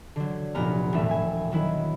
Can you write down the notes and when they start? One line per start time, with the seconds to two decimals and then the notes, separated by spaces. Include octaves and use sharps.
0.16 D3 F#3
0.55 F1 A#2 B3 A#5 F6
0.93 E1 A2 A3 E5
1.11 G#5
1.52 D#3 F#3 E4